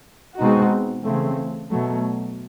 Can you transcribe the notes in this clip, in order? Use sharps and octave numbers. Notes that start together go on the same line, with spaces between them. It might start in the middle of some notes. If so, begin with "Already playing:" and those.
B2 G#3 C4 D#4 F#4
C#3 E3 A3 C4
B2 F#3 A3